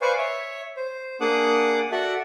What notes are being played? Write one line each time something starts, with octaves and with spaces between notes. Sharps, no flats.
B4 C5 D5 F5 G#5 C#6
C#5 E5
C5
A#3 D4 G#4 F#5 D6 D#6
F#4 A4 D5 E5 F#5